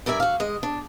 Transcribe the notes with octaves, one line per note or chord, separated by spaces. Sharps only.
G2 A#4 D5 E5 G#5
F#4 F5
G#3 D#5
D4